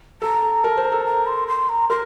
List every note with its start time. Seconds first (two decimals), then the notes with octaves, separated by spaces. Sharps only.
0.22 A4 A#5
0.64 A#4 A5
0.77 C5
0.85 A#5
0.92 A4
1.06 A#5
1.27 C6
1.48 C6
1.69 A#5
1.90 A#4 C6